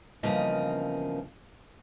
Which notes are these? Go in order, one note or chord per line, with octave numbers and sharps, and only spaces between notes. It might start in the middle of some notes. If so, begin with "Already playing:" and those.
E2 G2 C#3 F3 A#3 D#5